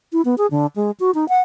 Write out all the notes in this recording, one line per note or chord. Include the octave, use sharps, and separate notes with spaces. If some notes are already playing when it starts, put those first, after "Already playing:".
E4
B3
G#4
D3
G#3
F#4
D#4
F#5